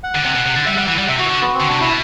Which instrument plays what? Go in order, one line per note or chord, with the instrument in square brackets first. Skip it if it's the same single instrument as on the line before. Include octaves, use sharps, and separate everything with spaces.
[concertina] F#5
[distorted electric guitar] D3
C3
B2
C3
D3
[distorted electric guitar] G3 [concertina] E5
[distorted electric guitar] G3 [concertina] F#5
[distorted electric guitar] E3 [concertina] F#5
[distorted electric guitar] G3 [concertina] F#5
[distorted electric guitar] C3 [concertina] E5
[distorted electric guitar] E3 [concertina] F#4
[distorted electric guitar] D3
[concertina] B3
C4
[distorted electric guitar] D3
[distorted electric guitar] C3 [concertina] D4
[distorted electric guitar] B2 [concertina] E4